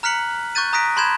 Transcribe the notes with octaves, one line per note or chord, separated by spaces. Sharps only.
A#5 F6 F#6 B6 C#7 F#7
C#6 F#6 G6 A6 D#7
A#5 D#6 F#6 A#6 B6 D7
A5 B5 C6 G6 G#6 E7